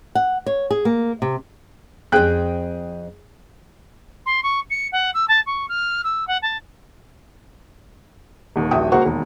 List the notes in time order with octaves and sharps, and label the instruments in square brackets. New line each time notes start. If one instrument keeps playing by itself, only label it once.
[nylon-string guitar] F#5
C#5
G#4
A#3
C3
[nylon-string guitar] F2 C4 [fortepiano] G#4 G5 F#6
[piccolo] C6
C#6
C#7
F#5
E6
A5
C#6
F6
E6
F#5
A5
[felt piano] D#1 D#2
D#1 A#1 F#4 E5 G5 D#6
C#2 A#3 F#4 C5 F#5 C#6
E1 D#2